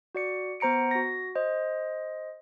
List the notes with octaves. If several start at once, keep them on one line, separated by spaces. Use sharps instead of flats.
F#4 D5 C#7
B3 C5 A#5 C#7 D7
F#4 A#6
C5 D#5